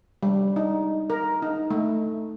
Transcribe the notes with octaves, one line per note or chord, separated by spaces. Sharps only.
G3
D#4
A#4
D#4
A3